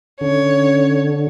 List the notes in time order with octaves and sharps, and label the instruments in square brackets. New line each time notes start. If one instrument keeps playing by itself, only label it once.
[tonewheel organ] D3 [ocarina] C#4 [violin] C#5